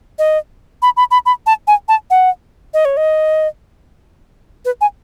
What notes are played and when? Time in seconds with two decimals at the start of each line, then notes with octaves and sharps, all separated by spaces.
0.18 D#5
0.82 B5
0.97 B5
1.11 B5
1.26 B5
1.46 A5
1.67 G#5
1.88 A5
2.10 F#5
2.74 D#5
2.85 C#5
2.97 D#5
4.65 B4
4.81 G#5